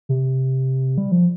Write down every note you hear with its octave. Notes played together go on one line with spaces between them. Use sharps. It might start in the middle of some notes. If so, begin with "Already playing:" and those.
C3
G3
F3